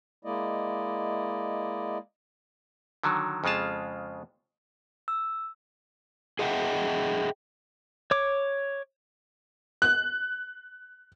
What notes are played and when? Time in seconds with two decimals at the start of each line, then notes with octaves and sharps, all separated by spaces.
0.25 G#3 A#3 E4 D5 D#5
3.03 D3 D#3 F#3
3.44 F2 C#3 G#3 F4 A5
5.08 E6
6.39 G#4 D#5 E5 F#5 G5
8.11 C#5 D6
9.82 F#6